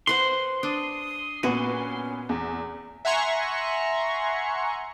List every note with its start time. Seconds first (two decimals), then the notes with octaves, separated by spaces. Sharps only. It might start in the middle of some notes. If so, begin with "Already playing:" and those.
0.07 B4 C5 F#5 C6
0.63 D4 D#6
1.43 A#2 B3 C#4 F#4 D#7
2.29 E2
3.05 E5 F#5 G#5 A#5 C6 C#6